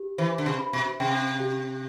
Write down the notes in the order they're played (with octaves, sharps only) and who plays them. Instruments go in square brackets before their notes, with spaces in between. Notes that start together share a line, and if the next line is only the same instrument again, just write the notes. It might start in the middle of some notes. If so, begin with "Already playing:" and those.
Already playing: [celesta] G4
[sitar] E3 [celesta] C5
[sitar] D3
C3
[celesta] B5
[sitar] B2
[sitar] C3 [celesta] G5
[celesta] G4